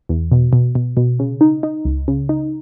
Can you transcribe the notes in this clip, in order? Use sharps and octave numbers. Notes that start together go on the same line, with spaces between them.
E2
B2
B2
B2
B2
C#3
D#4
D#4
C#2
C#3
D#4